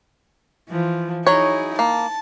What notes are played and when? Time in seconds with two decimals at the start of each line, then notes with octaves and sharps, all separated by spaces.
0.70 E3 F3
1.27 F#3 D#4 E4 G#4 C#5
1.79 A#3 A5